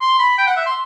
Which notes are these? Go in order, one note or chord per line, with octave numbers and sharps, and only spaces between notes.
C6
B5
G5
F#5
E5
C6